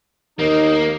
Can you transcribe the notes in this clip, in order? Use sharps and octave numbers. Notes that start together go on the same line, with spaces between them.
D#2 A#3 D#4